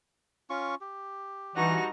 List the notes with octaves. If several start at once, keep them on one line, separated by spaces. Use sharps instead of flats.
C#4 F4 C#6
G4
G2 E3 D#4 F#4 A#6